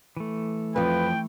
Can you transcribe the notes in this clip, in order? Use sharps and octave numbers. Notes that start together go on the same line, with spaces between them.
E3 A3
F2 F3 B4 G5